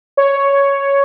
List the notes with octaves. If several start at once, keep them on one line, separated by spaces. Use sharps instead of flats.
C#5